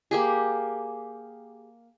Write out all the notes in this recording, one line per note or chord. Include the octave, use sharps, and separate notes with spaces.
A#3 G4 G#4